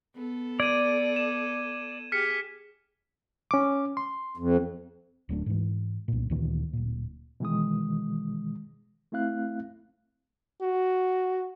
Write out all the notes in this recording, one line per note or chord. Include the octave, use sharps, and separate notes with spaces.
B3 A4
D5 G#6 D#7
E7
G4 G#4 F6 B6 C#7
C#4 D6
C6
F2
D1 F#3 A3 D4
G#2 E3
C2 A#2
D2 A#2 D#3 E3
D1 A#2
B2 D#3 E3 G#3 D#6
A3 C4 E4 F5 F#6
F#4